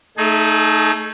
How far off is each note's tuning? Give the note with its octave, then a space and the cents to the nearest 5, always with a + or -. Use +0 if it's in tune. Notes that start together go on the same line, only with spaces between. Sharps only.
A3 +0 D#4 +0 G#4 +40